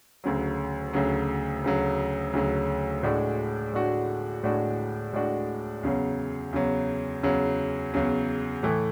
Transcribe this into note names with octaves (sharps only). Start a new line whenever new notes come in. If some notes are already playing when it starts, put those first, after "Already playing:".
D2 C#3 F#3
D2 C#3 F#3
D2 C#3 F#3
D2 C#3 F#3
A2 G#3 D4 F#4
A2 G#3 D4 F#4
A2 G#3 D4 F#4
A2 G#3 D4 F#4
E2 C#3 F#3
E2 C#3 F#3
E2 C#3 F#3
E2 C#3 F#3
A2 E3 A3